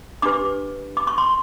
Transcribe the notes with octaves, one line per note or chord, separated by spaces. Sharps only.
D4 G4 B4 D6
D6
C#6
C6